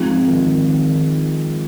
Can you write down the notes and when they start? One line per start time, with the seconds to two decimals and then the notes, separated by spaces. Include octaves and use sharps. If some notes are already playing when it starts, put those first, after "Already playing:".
Already playing: G#2 F3 C4 F4
0.28 D#3
0.69 D#3